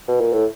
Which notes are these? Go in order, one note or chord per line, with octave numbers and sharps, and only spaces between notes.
B2
A#2
A2